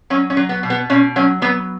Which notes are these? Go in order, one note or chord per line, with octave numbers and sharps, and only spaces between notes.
F#3 C#4
C#4
F#3
B3
B2
B3
B2 C#4
F#3 C#4
F#3 B3